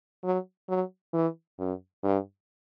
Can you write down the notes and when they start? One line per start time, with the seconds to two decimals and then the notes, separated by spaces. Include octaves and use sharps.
0.24 F#3
0.69 F#3
1.13 E3
1.59 F#2
2.04 G2